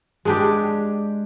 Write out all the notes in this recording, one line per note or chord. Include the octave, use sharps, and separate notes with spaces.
G#3 D4 G4